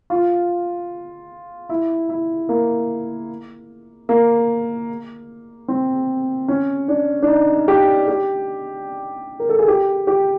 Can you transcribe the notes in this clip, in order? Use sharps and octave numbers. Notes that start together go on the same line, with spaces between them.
F4
E4
E4
A#3
A#3
C4
C#4
D4
D4
D#4
G4
G4
A#4
A4
G#4
G4
G4